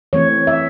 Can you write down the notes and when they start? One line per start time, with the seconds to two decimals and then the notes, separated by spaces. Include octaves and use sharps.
0.13 E3 A3 C4 C#5
0.47 E5